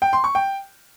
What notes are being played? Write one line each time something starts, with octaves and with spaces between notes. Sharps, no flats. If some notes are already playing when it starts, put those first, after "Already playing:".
G5
C6
C#6
G5